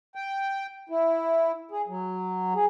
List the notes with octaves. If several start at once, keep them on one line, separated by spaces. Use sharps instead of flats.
G5
E4
G#4
F#3
G#4